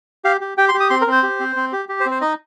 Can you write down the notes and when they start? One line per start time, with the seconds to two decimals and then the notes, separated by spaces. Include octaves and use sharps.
0.25 G4 F5
0.41 G4
0.58 G4 G5
0.69 C6
0.74 G4
0.80 D#6
0.90 C4 C6
1.01 A#4
1.07 C4 C5
1.23 G4
1.40 C4
1.56 C4
1.73 G4
1.89 G4
2.00 C5
2.06 C4
2.11 C5
2.21 D#4 D#5